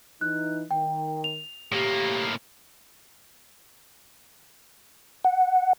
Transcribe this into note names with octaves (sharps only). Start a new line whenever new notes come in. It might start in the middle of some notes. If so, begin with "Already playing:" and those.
E3 D#4 F#6
D#3 G5
F7
A2 A#3 G4
F#5